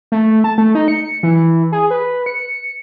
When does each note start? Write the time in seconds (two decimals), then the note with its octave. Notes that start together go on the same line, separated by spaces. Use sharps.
0.12 A3
0.44 A5
0.58 A3
0.75 D#4
0.88 C#7
1.23 E3
1.72 G#4
1.91 B4
2.26 C#7